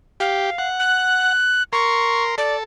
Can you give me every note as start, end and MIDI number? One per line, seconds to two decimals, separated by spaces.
0.20 0.50 67
0.20 0.67 77
0.58 1.33 78
0.80 1.63 90
1.73 2.35 70
1.73 2.35 84
1.73 2.24 85
2.38 2.63 69
2.38 2.56 74